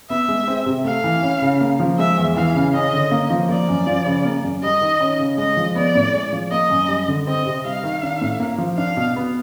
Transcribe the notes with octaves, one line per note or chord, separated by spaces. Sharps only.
B3 E5
G#3
C4
C3
A3 F5
E3
C#4
C#3
A#3
F3
G#3 E5
E2
E3 F5
C#3
C#4 D#5
D3
A#3
F3
A#3 D5
F#2
F3
C#3
A#3
F#2
G3 D#5
D#3
C#4
C#3
G#3 D#5
F3
B3 D5
A2
G#3
F3
A#3 D#5
F#2
G3
D3
C4 D#5
C3
G3 F5
D#3
D4
A2
A#3
F3
D4 F5
B2
B3